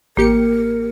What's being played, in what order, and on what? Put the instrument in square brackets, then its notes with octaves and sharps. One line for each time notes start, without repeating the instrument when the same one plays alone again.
[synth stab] A1 G4 C#7 [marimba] A#3 [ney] A#4